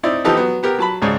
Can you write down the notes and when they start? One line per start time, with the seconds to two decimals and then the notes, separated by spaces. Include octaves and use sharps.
0.03 C4 D#4 E4 D5
0.24 E3 F3 B3 D#4 G4 A4
0.37 F#3 B3
0.63 B3 G4 A#4
0.78 F#3 A5 B5
1.01 G#1 C#2 G#2 C#5 D5